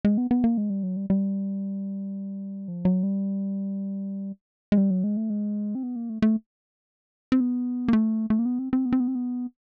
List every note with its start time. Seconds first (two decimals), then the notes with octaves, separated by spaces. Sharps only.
0.05 G#3
0.18 B3
0.31 B3
0.44 A#3
0.58 G#3
0.70 G3
0.83 F#3
0.96 G3
1.10 G3
2.68 F3
2.85 F#3
3.03 G3
4.72 G#3
4.77 G3
4.91 F#3
5.04 G#3
5.17 A3
5.30 G#3
5.75 C4
5.83 B3
5.96 A#3
6.10 A3
6.22 A3
7.32 C4
7.40 B3
7.88 A#3
7.93 A3
8.30 A3
8.39 A#3
8.46 B3
8.59 C4
8.73 C4
8.85 B3
8.93 C4
9.00 B3
9.08 C4
9.15 B3